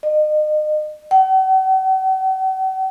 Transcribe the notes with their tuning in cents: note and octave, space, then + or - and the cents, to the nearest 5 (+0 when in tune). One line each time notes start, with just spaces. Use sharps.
D#5 -35
F#5 +45